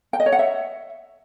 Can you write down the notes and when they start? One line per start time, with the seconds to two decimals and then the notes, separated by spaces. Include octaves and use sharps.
0.13 G5
0.20 D#5
0.26 C#5
0.32 F#5
0.39 E5